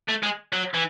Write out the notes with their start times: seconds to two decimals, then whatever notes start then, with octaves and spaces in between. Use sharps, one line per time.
0.09 A3
0.23 G#3
0.53 F#3
0.74 E3